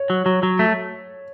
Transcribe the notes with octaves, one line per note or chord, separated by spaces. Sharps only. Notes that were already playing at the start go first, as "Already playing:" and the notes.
Already playing: C#5
F#3
F#3
F#3
A3